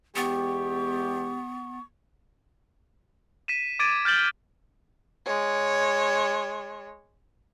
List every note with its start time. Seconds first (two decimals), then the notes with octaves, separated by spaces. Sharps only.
0.16 E2 G#3 B3 G4 C#6
3.48 B6 D#7 E7
3.79 D6 G#6 A6 D7 D#7
4.05 F6 G6 A6 F#7 G7
5.26 G#3 C#5